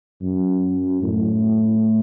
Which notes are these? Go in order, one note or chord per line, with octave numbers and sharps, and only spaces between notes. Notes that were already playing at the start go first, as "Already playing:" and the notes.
F#2
A2